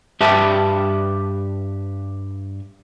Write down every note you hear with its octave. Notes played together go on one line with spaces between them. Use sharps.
G2 G4 B4 E5 A5